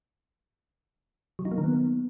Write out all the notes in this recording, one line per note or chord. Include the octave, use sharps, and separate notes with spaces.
F#3
D#4
A#3
D#3
B3